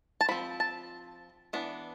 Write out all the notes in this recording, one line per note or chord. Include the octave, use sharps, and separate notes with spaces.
A5
F3 C4 B5
A5
E3 B3 D4